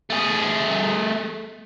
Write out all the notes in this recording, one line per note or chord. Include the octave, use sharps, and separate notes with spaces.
A3 G#4